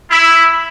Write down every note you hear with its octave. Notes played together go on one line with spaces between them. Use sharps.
E4